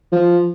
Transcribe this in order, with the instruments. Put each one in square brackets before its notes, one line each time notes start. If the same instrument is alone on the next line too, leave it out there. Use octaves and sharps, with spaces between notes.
[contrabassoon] F3